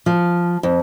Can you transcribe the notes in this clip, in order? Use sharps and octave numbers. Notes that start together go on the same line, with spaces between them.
F3
F2